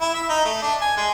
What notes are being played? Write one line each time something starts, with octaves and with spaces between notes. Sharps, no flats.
E4
E5
D#4
A3
D4
G#5
G#3